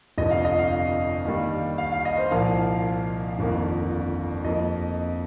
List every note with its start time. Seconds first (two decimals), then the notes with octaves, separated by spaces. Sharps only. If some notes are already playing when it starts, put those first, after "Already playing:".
0.18 G1 F2 C3 D#5
0.31 F5
0.45 D#5
0.59 F5
1.25 D#2 D#3 G3
1.78 F5
1.92 F5
2.05 D#5
2.18 C5
2.31 C2 A#2 F3 A#3 F5
3.39 G1 F2 D#3 A#3
4.44 F2 F3 A#3 D#5